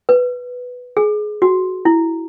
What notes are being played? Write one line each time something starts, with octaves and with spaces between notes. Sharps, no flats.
B4
G#4
F#4
E4